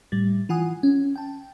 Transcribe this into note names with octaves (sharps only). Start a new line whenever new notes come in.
A2 G3 A6
E3 F4 F#5 G#5 D#6
C#4
G5 A5